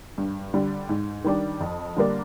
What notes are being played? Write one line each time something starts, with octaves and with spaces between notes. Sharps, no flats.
G2
D3 G3
G#2
D#3 G3 D4
F2
D3 G3 A#3 D4